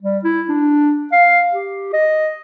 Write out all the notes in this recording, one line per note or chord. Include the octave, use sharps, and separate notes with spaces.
G3
E4
D4
F5
G4
D#5